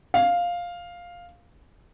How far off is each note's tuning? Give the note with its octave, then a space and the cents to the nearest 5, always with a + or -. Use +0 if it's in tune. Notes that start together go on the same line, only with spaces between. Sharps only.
F5 +5